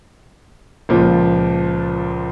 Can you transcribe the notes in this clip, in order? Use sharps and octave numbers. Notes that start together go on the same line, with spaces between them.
C#2 A#2 F3